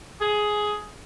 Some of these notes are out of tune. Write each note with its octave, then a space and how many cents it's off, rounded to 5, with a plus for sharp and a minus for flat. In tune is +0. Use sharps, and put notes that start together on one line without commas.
G#4 +10